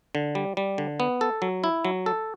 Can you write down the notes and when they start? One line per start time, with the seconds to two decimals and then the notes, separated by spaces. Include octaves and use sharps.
0.15 D3
0.35 G3
0.57 G3
0.78 D3
1.00 B3
1.21 A4
1.42 F#3
1.64 E4
1.85 F#3
2.06 A4